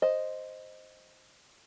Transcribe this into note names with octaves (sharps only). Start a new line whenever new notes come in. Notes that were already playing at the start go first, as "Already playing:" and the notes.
C5 D#5